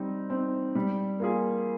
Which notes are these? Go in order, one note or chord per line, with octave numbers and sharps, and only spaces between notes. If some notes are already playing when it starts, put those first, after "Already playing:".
Already playing: G3 C4 D#4
C4 D#4
G3
A#3 F4 G#4